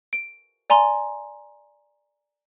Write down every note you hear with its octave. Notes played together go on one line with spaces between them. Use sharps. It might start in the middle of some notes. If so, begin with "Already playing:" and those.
D7
D5 G#5 A#5 C6